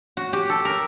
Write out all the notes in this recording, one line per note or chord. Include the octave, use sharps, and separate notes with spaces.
F#4
G4
A4
A#4